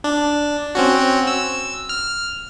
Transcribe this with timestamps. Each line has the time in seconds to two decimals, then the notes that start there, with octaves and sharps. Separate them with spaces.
0.04 D4
0.75 C4 C#4 F#4
1.27 E6
1.89 F6